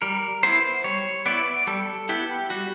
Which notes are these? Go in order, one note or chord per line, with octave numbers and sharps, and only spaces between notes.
G3 A#4
B3 E4 C5
G3 C#5
B3 E4 D5
G3 A4
B3 E4 G4
G3 F#4